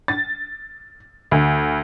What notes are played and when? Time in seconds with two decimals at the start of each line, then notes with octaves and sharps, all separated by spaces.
0.08 A6
1.31 D2